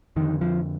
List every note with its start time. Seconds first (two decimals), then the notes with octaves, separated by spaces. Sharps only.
0.16 F2 D3 D#3
0.41 F3